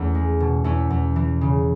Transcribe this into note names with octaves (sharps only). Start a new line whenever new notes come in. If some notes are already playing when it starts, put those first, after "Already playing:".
Already playing: E2 A3 C#4
G#3
B2
E2 C#4 E4
E2
E3
C#3